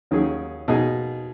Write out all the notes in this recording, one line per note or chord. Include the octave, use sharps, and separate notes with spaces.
D#2 D#3 F#3 C#4 G#4
B2 A#3 D#4 G#4